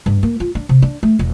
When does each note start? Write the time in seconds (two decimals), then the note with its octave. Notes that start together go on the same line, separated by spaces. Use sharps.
0.06 G2
0.23 A#3
0.40 F4
0.55 D4
0.69 C3
0.82 D4
1.03 A3
1.19 E1